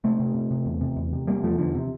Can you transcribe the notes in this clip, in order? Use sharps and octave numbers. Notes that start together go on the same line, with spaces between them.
C3 A3 C4
C3
C3
C3
E2
C3
E2
C3
C3 G3 A#3
E2 F3 A3
E2 D3 F3
C3